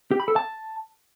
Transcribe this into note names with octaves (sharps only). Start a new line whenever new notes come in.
G4
B5
A4
A5